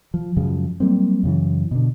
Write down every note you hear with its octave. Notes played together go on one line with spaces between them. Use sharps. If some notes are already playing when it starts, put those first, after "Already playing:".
F3
F#2 C#3 F3 G#3
F#3 G3 A#3 C4
F#2 C#3 E3
B2 D3